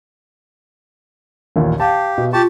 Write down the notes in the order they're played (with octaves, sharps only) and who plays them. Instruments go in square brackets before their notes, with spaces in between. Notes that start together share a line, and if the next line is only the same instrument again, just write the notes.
[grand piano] A1 D#2 A#2
[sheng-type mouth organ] G4 [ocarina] F5 [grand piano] A5
[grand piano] B2
[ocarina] F4 [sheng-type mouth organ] G4 A5 [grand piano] C#6